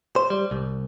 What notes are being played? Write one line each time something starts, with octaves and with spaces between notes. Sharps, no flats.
C5
G3
C2